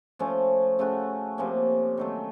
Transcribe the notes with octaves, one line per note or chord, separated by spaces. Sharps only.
F3 A3 C#4
C#3 A3 C#4 F#4
C3 F3 A#3 C#4
D#3 F#3 A3